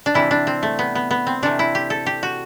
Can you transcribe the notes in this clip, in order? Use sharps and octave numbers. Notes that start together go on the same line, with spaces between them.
D4
C3 E3 G3 E4
D4
C4
A3
B3
B3
B3
C4
C3 E3 A3 D4
E4
G4
A4
G4
F#4